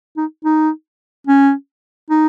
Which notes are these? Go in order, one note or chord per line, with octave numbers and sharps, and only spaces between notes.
D#4
D#4
C#4
D#4